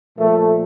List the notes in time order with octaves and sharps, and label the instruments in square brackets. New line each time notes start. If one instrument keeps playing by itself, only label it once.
[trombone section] A#2 F3 A3